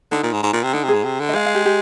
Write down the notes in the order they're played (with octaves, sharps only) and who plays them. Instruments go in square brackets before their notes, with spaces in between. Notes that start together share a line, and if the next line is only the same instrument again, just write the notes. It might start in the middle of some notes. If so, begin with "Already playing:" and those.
[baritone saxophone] D3 [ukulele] D#4
[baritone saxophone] A#2
G#2
G#2
A#2
C3
[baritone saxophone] D3 [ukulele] D#4
[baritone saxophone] C3 [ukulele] G#4
[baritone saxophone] G#2
C3
D3
[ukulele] D#5
[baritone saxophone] G#3 [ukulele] F5
[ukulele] F5
G4
G4